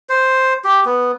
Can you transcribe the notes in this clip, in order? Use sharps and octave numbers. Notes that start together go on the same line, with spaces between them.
C5
G4
B3